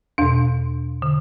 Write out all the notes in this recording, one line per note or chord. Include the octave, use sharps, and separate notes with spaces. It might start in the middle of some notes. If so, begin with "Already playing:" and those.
E2 B2 D4
D3